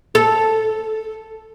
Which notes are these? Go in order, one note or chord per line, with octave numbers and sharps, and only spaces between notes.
A4